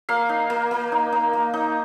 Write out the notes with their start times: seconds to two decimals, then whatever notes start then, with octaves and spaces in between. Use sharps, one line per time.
0.09 A#3 F5
0.29 D#4
0.50 A#3
0.71 A#3
0.92 D#4
1.12 D#4
1.33 A#3
1.54 D#4